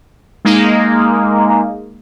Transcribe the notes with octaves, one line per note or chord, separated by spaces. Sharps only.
G#3 A#3 D#4